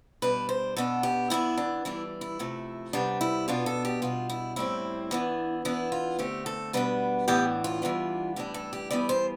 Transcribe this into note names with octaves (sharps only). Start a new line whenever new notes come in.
B2 G3 D4 B4
C5
B2 B3 D4 A4
G4
E3 B3 D4 E4
D4
E3 G3 D4 E4
E4
C3 F3 A3
C3 G3 B3 D4
E4
B2 B3 D4 F4
A4
G4
B2 G3 D4 F4
E4
A2 G3 C4 E4
E3 B3 D4
E3 B3 D4 E4
F4
D3 A3 C4 G4
A4
B2 G3 B3 D4 B4
A2 E3 B3 D4 G4
F4
E3 G3 B3 D4
A2 E3 G3 D4 G4
A4
G4
E3 G3 B3 D5
C5